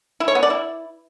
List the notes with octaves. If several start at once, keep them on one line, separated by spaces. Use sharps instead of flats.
E4
C#5
B3
D5
E4